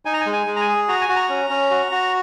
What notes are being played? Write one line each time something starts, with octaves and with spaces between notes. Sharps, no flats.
D#4 G#5
A#5
G#5
G#3
G#5
G#3
A#5
G#5
G#4
F#4 A#5
G#5
F#4
A#5
C#4
C#4
F#4
F#4